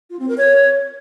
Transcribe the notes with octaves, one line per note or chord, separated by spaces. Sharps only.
F4
C4
A#4
C#5